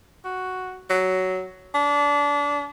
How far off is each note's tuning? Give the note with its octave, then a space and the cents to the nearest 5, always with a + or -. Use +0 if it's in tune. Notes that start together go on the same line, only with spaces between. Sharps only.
F#4 +0
F#3 +10
D4 -25